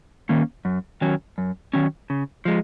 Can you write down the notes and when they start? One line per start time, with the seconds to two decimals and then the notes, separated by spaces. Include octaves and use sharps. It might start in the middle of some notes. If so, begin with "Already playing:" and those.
0.29 D#3 A#3 C#4
0.65 F#2
1.01 D#3 F#3 C#4
1.38 F#2
1.73 D#3 F#3 C#4
2.10 C#3
2.45 F3 G#3